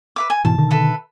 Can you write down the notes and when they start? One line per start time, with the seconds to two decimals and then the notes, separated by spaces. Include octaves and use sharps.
0.16 B4 E5 D6
0.30 G#5
0.45 G#2 B2 E3 A5
0.58 B2 D3 D#3
0.71 A4 B4 E5